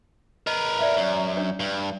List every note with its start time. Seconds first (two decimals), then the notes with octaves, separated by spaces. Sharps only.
0.47 A#4 B4 D#5
0.79 D5 E5 F5
0.96 F#2
1.37 D4 C#5
1.60 G2